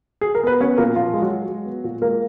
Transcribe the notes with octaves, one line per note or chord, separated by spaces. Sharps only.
G#4
A#4
B3 B4
B3 C#4 C#5
A#2 A#3 A#4
A#2 F3 F4
G#3
F#3 F#4
G#3
G#3
B3
A#2
G#3 A#3 A#4